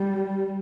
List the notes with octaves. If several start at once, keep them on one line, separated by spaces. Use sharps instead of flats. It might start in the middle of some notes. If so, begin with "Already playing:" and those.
Already playing: G3